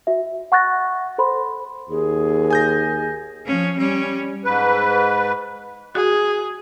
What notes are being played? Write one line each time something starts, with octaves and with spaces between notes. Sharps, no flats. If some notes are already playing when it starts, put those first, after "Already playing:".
F#4 E5
F#5 C#6 F#6 A6 A#6
A4 C5 B5 C6
D#2 G#4
G#5 G6 A#6
F3 C#4
G3 C#4
G#2 B4
F#4 G#4